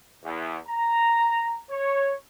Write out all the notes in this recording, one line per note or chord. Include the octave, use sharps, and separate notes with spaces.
E2
A#5
C#5